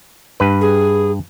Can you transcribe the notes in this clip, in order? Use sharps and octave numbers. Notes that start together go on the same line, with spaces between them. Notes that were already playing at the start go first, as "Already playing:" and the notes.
G2 B4
G#4